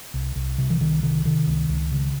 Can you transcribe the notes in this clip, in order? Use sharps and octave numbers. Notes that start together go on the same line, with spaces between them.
C2
C2
C3
E3
C2 D#3
C3 D#3
C3 D#3
C#2
C#2
C#3